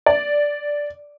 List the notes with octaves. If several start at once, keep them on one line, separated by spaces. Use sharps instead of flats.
D5